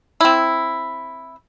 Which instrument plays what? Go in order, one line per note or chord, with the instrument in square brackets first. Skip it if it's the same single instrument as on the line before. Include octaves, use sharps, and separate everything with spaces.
[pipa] C4 E4